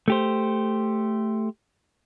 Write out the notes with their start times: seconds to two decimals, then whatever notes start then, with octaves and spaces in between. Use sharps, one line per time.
0.08 A3 G4 C5